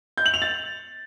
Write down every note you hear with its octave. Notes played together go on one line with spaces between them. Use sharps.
G6
F#7
F7
A6